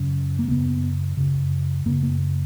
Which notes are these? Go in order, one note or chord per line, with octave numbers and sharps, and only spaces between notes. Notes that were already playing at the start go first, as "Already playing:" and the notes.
Already playing: F#2 C#3
A#3
F#2 C#3 B3
F#2 C#3
F#2 C#3 A#3
A#3